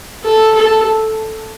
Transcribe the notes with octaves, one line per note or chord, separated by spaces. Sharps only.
A4
A4